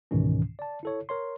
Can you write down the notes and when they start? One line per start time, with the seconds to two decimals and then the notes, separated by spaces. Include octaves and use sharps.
0.11 C#2 G#2 B2 D#3 E3 C#4
0.59 D5 A5
0.83 E4 A4 C#5
1.09 A#4 C#5 C6